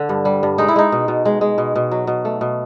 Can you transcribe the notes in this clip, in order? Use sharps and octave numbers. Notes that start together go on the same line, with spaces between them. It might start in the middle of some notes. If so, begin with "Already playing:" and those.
Already playing: D3 D4
G2
G3
G2
G#3 D#4
E4
G#3 D#4
B2
B2
G#3
G#3
B2
B2
F#3
B2
A3
B2